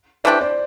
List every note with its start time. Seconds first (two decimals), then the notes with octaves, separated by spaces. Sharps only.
0.24 E3 A3 D4 G4 C5 D5
0.40 C5 D5